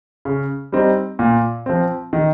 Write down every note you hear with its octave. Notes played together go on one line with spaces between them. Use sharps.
C#3
G3 C4 D#4
A#2
F3 C4
D#3